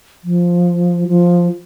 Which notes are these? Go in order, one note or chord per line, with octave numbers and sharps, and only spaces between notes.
F3
F3